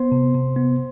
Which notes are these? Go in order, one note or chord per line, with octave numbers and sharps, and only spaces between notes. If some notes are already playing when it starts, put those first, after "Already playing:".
Already playing: B3 C5 C6
C3
C3
B3